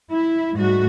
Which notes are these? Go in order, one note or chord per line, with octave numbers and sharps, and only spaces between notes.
E4
G#2 G3 A3 F#4